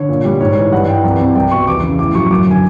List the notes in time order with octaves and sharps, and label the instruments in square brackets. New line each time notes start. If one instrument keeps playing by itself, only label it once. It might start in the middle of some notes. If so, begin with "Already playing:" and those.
Already playing: [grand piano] D3 C#5
A#2
G3
G#2 C#5
E3
G2 F#5
E3 G5
C2
C3
C2 G5
B2 C#6
E2 D6
C#3
A2 D6
F#3 C#6
F#2 D6
D3 G#5